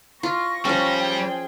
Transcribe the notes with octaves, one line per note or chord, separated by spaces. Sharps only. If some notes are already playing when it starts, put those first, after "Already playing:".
F4 C#6 A#6
F3 G3 C#4
G#4 G5